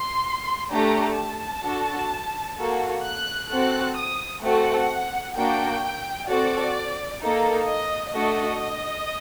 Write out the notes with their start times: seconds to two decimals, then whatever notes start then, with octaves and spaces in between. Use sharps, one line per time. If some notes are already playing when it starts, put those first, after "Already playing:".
Already playing: C6
0.70 A3 D4 G4 A#5
1.17 A5
1.63 D4 F#4 A4
2.56 A#3 F#4 A4
3.03 F#6
3.48 C4 F#4 A4 F#6
3.95 D#6
4.42 A3 C4 F#4 A4 F#5
5.34 A#3 D4 F#4 G5
6.28 C4 F#4 A4 D5
7.21 A#3 D#4 A4
7.67 D#5
8.13 A3 D4 F#4 A4 D#5